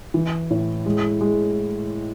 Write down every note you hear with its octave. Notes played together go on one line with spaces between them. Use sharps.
E3
A2
G#3
G#3